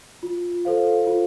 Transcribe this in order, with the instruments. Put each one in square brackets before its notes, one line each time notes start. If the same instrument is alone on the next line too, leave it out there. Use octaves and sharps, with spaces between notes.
[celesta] F4
A4 C5 F5
F4